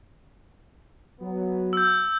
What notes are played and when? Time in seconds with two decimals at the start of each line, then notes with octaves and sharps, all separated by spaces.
1.20 F#3 B3
1.73 E6 G6